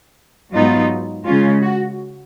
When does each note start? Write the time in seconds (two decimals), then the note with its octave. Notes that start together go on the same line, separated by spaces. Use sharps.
0.53 G#2 F#3 B3 D#4 F4
1.25 C#3 G#3 C#4 F4
1.61 F#4